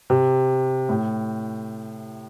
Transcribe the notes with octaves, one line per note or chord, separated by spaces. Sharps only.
C3
A2